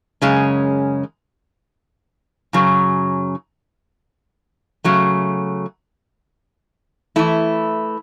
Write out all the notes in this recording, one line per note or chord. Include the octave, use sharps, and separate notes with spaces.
F#2 C#3 G#3 C#4
F#2 C#3 F#3
C#3 F#3 A3
E3 A3 E4